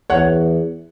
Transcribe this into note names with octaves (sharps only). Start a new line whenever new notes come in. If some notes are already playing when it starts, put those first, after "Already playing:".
E2 C#5 F#5